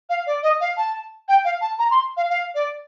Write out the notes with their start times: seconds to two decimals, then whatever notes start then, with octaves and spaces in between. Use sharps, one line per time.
0.10 F5
0.27 D5
0.43 D#5
0.61 F5
0.77 A5
1.29 G5
1.45 F5
1.61 A5
1.79 A#5
1.91 C6
2.17 F5
2.30 F5
2.55 D5